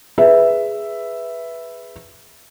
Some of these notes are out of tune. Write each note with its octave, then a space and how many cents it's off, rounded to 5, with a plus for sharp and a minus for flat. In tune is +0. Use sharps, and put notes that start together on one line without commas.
G#4 +0 B4 +0 E5 +0